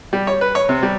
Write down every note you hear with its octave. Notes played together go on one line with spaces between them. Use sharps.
G3
C#5
B4
C#5
C3
G3